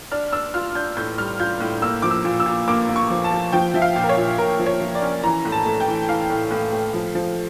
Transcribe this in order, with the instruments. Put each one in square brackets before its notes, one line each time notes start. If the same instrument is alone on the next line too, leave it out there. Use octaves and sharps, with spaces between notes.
[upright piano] D4 F6
D4 E6
F4 F6
D4 G6
A2 G6
G3 F6
F4 G6
A2
A#3 E6
F3 D6
E6
A#2
E6
A#2
A#3 D6
A#3
C#6
F3
A5
F3
F3 G5
F3 E5
F5
A#2
A#4
C#5
A#2
A#2 A#4
F3
C#5
F3
D5
C#4
E3 A#5
A2
A5
A3
G5
E3
E3 F5
A2
A2
A3
F3
F3